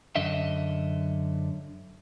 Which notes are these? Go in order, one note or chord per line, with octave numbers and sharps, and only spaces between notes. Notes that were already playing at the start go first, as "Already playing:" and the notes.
F#2 D3 D#5 E5